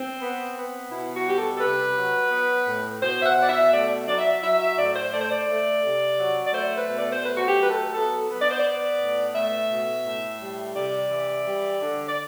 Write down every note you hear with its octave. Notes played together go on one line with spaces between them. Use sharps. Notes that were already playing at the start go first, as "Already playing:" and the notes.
Already playing: C4
B3
B3
B2 E4
F#4
G3 G4
A4
A4
C3 B4
F#3
B3
A2
B2 C5
E5
F#5
B2 D5
E5
A3 D5
F#3 D5
E5
F#3 E5
E5
A2 D5
C5
A3 D5
C5
D5
A3
C3
F#3
D5
A3 C5
B4
B2
D5
C5
A3 B4
F#4
G4
F#3 B4
A4
B3 A4
B3
D5
C5
D5
B3
A2
A3 E5
B2
A2
G3
C3 D5
E3
G3
D3
D5